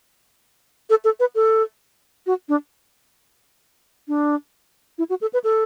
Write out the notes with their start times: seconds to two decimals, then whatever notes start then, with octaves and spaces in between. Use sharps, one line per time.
0.90 A4
1.05 A4
1.20 B4
1.35 A4
2.26 F#4
2.49 D4
4.08 D4
4.98 E4
5.10 F#4
5.21 A4
5.33 B4
5.44 A4